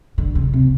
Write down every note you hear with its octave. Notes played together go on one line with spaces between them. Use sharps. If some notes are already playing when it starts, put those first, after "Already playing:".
D3
C#3
C3